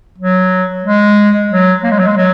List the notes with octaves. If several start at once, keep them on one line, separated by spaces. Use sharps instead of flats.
F#3
G#3
F#3
A#3
G#3
F#3
G#3
F#3